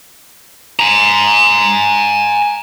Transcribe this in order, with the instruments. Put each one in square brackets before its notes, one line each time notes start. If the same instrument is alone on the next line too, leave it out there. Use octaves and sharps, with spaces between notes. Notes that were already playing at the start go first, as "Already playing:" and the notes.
[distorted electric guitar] G#5 A#5